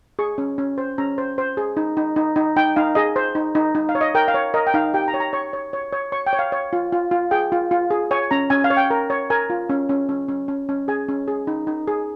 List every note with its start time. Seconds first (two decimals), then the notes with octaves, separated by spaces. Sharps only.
0.19 G#4 C#6
0.38 C#4
0.58 C#4
0.78 C5
0.98 C#4 A#5
1.18 C5
1.38 C5
1.57 G#4
1.77 D#4
1.97 D#4
2.16 D#4
2.36 D#4
2.56 D#4 G5
2.76 D#4 F5
2.95 G#4 D#5
3.16 C5
3.35 D#4
3.55 D#4
3.75 D#4
3.89 F5
3.95 C#5
4.01 D#5
4.15 A#4 G5
4.28 F5
4.34 C#5
4.54 A#4 D#5
4.67 G5
4.74 D#4 F5
4.94 G4 G5
5.08 A#5
5.14 C#5
5.20 A#5
5.33 C#5 C#6
5.53 C#5
5.73 C#5
5.93 C#5
6.12 C#5 C#6
6.27 G5
6.33 C#5
6.39 F5
6.52 C#5
6.73 F4
6.93 F4
7.11 F4
7.31 G#4 G5
7.52 F4
7.71 F4
7.91 G#4
8.11 C#5 G#5
8.31 C#4 A#5
8.50 C#4 G#5
8.64 F5
8.70 C#5
8.77 G5
8.90 A#4
9.10 C#5
9.30 A#4 G#5
9.50 F4
9.70 C#4
9.89 C#4
10.09 C#4
10.28 C#4
10.48 C#4
10.69 C#4
10.88 G#4 G#5
11.09 C#4
11.28 G#4
11.47 D#4
11.67 D#4
11.88 G#4